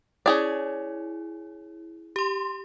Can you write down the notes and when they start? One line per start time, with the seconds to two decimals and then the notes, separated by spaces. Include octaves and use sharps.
0.26 C#4 E4 G#4 D5
2.16 G4 C6